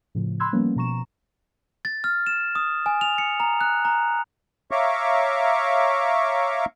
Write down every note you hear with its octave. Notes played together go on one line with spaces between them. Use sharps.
A2 C#3 F3
B5 C6 E6 F#6 G#6
F3 G3 A#3 B3 C#4
B2 F3 A#5 C#6 E7
A6
F6
E7
D#6
G#5
F7
C#7
A#5
F#6
A#5
C#5 E5 F5 A#5 C#6 D6